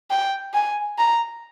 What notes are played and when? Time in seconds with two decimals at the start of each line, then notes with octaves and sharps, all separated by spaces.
0.10 G5
0.54 G#5
0.98 A#5